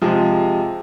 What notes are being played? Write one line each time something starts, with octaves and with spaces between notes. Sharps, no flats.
C3 F3 G#3